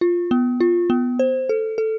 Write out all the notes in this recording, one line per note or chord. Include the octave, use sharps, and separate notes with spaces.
F4
B3
F4
B3
C5
A4
A4